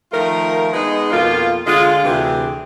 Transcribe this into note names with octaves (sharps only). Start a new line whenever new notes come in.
D#3 F3 A3 F4 A#4
G#3 B3 D#4
F2 B2 A#3 F4
D3 G#3 F4
D2 C3 E3 D4 G4 G#4